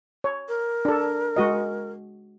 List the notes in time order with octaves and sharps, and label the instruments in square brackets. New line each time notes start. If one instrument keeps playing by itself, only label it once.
[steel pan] C#5
[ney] A#4
[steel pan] D4 A4
G#3 F#4 D#5